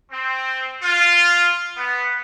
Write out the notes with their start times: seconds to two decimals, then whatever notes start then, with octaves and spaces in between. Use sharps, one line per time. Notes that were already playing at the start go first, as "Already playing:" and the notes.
0.11 C4
0.81 F4
1.76 B3